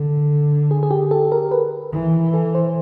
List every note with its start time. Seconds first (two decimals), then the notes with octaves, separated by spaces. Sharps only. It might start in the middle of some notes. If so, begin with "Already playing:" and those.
Already playing: D3 A4
0.71 G#4
0.83 G#4
0.91 G4
1.11 A4
1.32 A#4
1.52 B4
1.93 E3
2.34 A4
2.55 C5